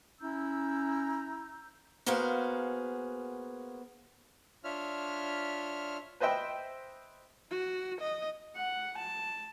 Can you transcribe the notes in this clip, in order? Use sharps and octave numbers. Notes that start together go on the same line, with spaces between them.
C#4 E4 A#5 E6 G6
A#3 B3 F#4 G#4 C5 F5
D4 F4 C#5 E5 F6
B4 C5 D#5 E5 G5
F#4
D#5
F#5
A5